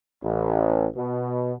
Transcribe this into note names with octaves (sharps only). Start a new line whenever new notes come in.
A1
B2